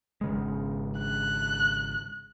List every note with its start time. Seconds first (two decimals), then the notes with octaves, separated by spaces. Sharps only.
0.21 G#1 C#3 G#3
0.99 F#6